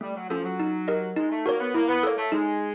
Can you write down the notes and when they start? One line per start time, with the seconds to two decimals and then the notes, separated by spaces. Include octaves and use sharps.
0.01 G3 A3
0.15 F#3
0.29 F3 C#4 F4 A4
0.43 F#3
0.60 D#4
0.88 G4 A#4 D#5
1.16 G#3 D#4
1.30 A3
1.46 A#3 F#4 A#4 C#5
1.60 B3
1.74 A#3 E4
1.88 B3
2.03 A#3 A4 C#5
2.17 A3
2.32 G#3 D#4